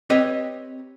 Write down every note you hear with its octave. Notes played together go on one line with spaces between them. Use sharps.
C4 G4 B4 C#5 D#5